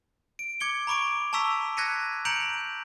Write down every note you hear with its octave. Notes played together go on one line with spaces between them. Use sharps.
D7
D6 G#6 C#7 G7
A#5 B5 C#6 D6 D7
A5 A#5 C#6 E6 B6 F7
F#6 G#6 A#6 B6 C#7 D#7
A#5 G6 C#7 D7 F7 F#7